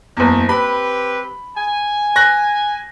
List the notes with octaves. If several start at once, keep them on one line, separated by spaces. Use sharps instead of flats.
F#1 E2
C4 G4 B4 B5
G#5
F#6 A#6